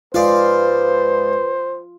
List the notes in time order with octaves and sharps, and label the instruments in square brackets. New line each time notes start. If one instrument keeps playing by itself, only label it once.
[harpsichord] G#2 D5 F5 [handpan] F4 [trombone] B4 [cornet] C5